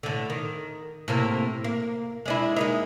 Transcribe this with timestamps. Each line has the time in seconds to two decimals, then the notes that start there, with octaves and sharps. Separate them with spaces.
0.03 A2 D3
0.30 D#3
1.08 A2 C3 A#3
1.64 A#3
2.26 G#3 D4 E4
2.56 G#3 A#3 D#4